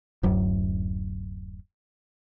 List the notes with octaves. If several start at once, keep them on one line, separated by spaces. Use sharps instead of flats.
D1 F#2